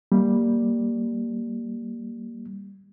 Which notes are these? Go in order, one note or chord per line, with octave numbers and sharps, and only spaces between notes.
G3 A#3